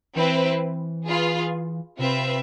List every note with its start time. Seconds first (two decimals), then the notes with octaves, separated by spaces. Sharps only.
0.15 E3 C4 E4 B4
1.07 F4 G#4 B4
1.98 C3 C4 F4 B4 E5